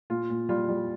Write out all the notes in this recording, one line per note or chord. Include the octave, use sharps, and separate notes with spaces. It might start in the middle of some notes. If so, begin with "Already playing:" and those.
A#2 F4
A#2
G3 F4
G3